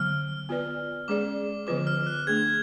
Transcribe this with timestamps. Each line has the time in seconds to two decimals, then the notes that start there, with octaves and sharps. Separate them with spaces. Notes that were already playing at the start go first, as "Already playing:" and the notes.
Already playing: D3 F#3 B3 F6
0.49 B3 F4 B4 D5
1.08 G#3 C#4 G#4 D5 D6
1.67 D3 F3 B3 F4 B4 D6
1.87 F6
2.07 F#6
2.27 A3 D4 G#4 G#6